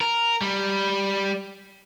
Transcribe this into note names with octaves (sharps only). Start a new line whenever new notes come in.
A#4
G3